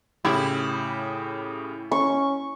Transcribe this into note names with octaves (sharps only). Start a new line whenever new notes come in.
A2 C#3 E4 G4
C#4 C#6